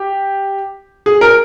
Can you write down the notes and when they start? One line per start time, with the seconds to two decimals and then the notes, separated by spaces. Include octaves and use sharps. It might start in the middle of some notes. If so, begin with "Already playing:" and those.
Already playing: G4
1.06 G#4
1.21 A#4